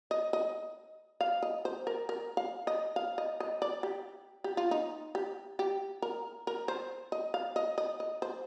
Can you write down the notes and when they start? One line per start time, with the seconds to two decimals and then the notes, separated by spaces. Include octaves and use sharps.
0.11 D#5
0.33 D#5
1.21 F5
1.43 D#5
1.65 C5
1.87 A#4
2.09 A#4
2.37 F5
2.67 D#5
2.96 F5
3.18 D#5
3.40 D#5
3.62 D5
3.83 G4
4.44 G4
4.57 F4
4.71 D#4
5.15 G4
5.59 G4
6.02 A#4
6.47 A#4
6.68 C5
7.12 D#5
7.34 F5
7.56 D#5
7.78 D#5
8.00 D#5
8.22 C5